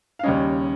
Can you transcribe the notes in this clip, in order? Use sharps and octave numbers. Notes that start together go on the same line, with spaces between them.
F5
D#2 C#3 G3 C#4 D#5